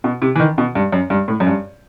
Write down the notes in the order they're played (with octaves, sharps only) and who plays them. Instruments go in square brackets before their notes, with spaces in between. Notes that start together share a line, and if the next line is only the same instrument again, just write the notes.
[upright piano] B2
C3
E3
D#3
B2
G2
F#2
G2
A2
F#2
G2